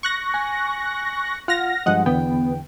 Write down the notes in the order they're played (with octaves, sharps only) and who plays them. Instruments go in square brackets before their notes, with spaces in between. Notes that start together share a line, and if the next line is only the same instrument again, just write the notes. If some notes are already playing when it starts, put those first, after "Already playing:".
[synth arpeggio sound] C#6 F#6 A#6
[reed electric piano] G#5
[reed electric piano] F4 [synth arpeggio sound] F#5 F6 A#6
[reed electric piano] G2 F3 G#3 [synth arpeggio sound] D#5 F#5
[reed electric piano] E2 D3 G5 [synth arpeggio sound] B3